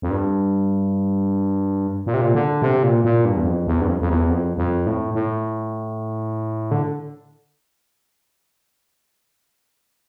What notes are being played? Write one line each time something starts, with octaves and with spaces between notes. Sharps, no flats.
F2
G2
A#2
C3
A#2
D3
C3
A#2
A#2
G2
E2
F2
E2
G2
F2
F2
E2
F2
F2
A2
A2
D3